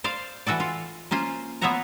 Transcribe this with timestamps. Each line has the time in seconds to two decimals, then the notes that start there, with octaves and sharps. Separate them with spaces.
0.04 C5 D5 F5
0.47 E3 F#4 A4 D5
0.60 F4
1.11 A#3 C#4 F4 C5
1.61 B3 F4 C#5 E5 F#5 A#5